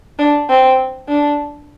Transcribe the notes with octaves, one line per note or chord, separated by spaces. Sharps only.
D4
C4
D4